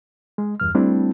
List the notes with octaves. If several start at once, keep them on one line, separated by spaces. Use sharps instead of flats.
G#3
E2 G2 F6
G3 A3 C4 D4 E4